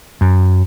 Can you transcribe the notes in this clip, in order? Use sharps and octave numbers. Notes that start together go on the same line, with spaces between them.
F#2